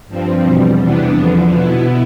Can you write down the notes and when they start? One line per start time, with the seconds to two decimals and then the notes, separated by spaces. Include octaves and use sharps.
0.08 G2 F3 C4
0.44 E2 B2 G3
0.79 E2 C3 E3 B3 D4
1.15 E2 D3 F3
1.50 B2 B3 E4